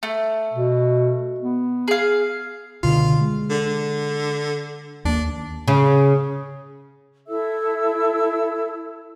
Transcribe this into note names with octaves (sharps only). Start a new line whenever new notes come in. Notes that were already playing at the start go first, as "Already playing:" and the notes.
A3
B2
B3
G#4 F5
C#2 B2 D3 F4
G#3
D3
D#2 G3 A#3 D4
C#3
E4 A4 E5 E6